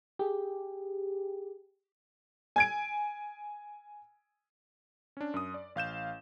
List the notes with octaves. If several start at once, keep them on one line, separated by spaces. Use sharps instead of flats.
G4 G#4
G#5 G#6 D7
C#4 D4
F#2 D#6
D5
A1 F5 G6 E7